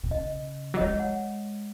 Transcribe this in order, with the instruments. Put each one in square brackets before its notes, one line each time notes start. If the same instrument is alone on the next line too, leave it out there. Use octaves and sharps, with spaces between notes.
[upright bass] B2
[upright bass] C#3 [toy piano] D#5
[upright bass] F#3
[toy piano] D#5
[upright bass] G#3 [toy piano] C#5
[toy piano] F#5